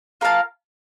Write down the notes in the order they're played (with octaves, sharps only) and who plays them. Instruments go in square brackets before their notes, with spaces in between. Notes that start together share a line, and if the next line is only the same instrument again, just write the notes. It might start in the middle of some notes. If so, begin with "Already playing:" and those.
[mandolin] F4 A#4 F5 A5